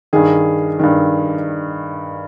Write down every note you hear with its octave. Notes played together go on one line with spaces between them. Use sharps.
G2 D#3 G#4
G2 D#3